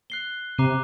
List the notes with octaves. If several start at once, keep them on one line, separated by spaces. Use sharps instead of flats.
F#6 C7 G7
C3 A#5 D6 F#6 C7 D#7